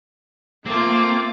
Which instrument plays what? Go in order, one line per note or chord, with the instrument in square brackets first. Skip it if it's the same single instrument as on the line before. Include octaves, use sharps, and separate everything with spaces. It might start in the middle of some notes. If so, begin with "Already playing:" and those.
[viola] A3 F4 [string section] A#3 [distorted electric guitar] C4 [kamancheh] D6